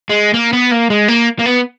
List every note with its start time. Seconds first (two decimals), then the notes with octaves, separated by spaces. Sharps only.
0.10 G#3
0.34 A#3
0.53 B3
0.71 A#3
0.90 G#3
1.08 A#3
1.39 A#3
1.46 B3